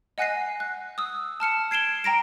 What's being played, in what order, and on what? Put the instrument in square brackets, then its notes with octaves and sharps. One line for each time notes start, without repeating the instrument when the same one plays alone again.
[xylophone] D#5 F#5 G#5 F#6 A#6 C7
F#6
D#6 E6
A5 F6 C#7 E7
G#6 C7 D7 E7 G7
G5 A#5 A#6 D7